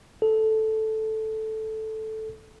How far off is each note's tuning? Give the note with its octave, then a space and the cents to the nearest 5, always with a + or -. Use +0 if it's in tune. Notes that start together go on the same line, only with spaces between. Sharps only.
A4 -5